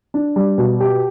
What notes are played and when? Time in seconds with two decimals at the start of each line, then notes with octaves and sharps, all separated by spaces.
0.14 D4
0.36 G3
0.58 B2
0.80 G4